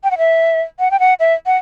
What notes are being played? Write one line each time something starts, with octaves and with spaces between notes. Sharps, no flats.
G5
F#5
E5
F#5
G5
F#5
E5
F#5